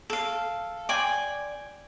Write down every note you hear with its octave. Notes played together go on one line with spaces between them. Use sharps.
A4 F5
D5 G5 G#5 C6